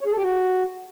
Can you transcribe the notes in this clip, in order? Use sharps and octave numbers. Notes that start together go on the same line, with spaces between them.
C#5
G#4
A4
G4
F#4